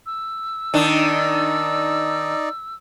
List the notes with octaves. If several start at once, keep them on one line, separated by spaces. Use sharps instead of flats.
E6
D#3 D4 D#4 D5